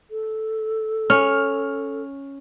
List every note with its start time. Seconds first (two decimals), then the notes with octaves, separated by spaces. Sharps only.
0.11 A4
1.10 C#4 F6